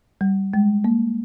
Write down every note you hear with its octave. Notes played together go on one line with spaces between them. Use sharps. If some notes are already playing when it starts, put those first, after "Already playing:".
G3
G#3
A#3